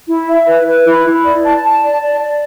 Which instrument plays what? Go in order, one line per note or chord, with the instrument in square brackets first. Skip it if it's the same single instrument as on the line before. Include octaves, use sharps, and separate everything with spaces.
[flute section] E4
E5
B4
B4
E4
E4
D5
A5
A5
D5
D5
D5